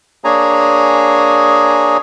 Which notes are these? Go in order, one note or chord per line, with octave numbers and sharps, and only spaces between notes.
A#3 D4 G#4 C#5 G#5 A#5